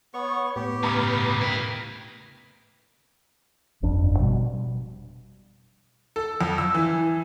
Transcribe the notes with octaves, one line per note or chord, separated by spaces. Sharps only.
B3 C#5 C#6
A2 B3 G4
G2 C#3 A#5 B5 D#6
E4 A#4 G5
G1 F2 D4
B2 G3
A4
F2
E6
E3